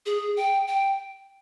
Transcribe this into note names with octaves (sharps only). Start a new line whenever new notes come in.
G#4
G5
G5